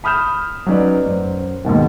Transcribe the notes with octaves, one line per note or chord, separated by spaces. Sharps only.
B5 D#6 F6 G6 E7
F#3 C#4 D#4 B4 D5
F#2 C5
D#2 G#2 B2 D#3